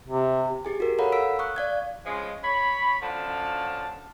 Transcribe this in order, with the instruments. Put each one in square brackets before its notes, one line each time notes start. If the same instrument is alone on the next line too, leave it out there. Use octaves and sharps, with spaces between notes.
[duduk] C3
[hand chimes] G4 G#4 G#5
F#4 A#4
A4 C#5 F5 F#5 A#5 B5
E6 B6 D7
C#6 D#6 F#6
D5 F5 G#6
[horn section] C#3 F3 G#3
C#5 B5
F#2 D3 F3 F5 A5